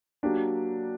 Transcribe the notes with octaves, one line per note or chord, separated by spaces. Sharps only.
F#3 A#3 D4 G4